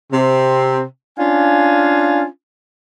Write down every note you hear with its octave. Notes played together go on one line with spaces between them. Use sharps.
C3 C4
C#4 D4 F4 F5 G#5